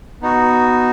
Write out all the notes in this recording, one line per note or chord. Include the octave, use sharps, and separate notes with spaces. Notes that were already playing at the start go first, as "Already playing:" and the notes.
B3 D#4 F#4